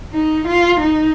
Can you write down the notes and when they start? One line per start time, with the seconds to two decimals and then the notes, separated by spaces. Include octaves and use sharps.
0.13 D#4
0.47 F4
0.81 D#4